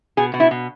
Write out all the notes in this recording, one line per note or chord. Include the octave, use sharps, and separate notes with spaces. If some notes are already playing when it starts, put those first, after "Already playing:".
B2 G#4
B2
E4
B2